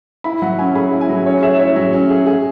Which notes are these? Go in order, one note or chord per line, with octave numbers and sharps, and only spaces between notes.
E4 B5
F#3 F#5
C#4 G#5
G#4 B5
E4
G#5
F#3
C#4 C#5
G#4 E5
E4 C#5
F#3
C#4
G#4
G#4